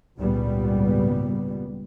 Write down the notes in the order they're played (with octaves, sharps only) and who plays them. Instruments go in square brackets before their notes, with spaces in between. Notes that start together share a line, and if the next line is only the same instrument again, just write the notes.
[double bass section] G#1 C#2 A#2 G3 B3